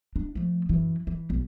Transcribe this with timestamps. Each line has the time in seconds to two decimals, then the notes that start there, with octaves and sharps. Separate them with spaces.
0.16 D4
0.35 F3 A3
0.69 F#2 E3
1.07 E3
1.30 B1